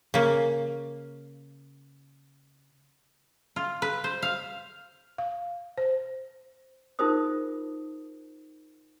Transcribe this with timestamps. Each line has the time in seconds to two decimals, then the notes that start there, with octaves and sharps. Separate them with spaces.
0.14 C#3 A#3
3.56 F4
3.82 B4
4.04 C5
4.22 F5
5.18 F5
5.78 C5
6.99 D#4 F4 G#4 A#4 C5 D#6